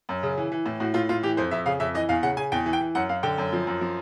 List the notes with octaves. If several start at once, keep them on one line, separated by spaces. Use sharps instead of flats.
F#2
C#3
E3
E3
A2
A2 F#4
A2 F4
A2 F4
E3 G4
F2 C5
F2 E5
C#3 F5
F2 E5
E3 D#5
E2 F5
C#3 F#5
C#3 G#5
E2 G5
E3
G5
E3
F#2 F#5
F#2 F5
D3 G5
F#2
F3
F#2
F3